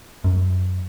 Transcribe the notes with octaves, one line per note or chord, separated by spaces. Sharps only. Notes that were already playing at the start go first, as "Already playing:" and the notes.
F#2